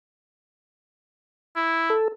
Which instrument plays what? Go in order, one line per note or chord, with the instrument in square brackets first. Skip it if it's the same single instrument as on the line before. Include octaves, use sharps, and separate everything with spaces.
[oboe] E4
[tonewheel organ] A4